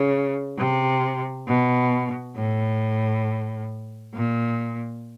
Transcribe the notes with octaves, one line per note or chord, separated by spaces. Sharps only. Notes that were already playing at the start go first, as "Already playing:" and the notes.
Already playing: C#3
C3
B2
A2
A#2